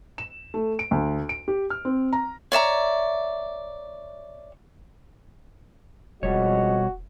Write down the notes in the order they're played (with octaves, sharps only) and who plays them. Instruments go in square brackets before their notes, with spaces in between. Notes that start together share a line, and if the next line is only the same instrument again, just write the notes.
[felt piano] E7
A3
D7
D2
D7
G4
F6
C4
A#5
[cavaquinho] C#5 D5 E5 A#5
[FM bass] E1 [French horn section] F2 G#3 D#5 [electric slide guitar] B2 G3 C#5 [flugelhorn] F#4